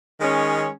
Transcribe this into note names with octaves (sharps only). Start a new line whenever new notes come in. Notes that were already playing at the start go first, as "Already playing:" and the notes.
D#3 G#3 C#4